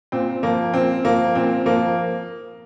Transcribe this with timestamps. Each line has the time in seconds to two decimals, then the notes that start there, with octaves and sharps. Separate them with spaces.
0.12 A#2 C4
0.43 F3 A#3
0.74 A#2 C4
1.05 F3 A#3
1.35 A#2 C4
1.66 F3 A#3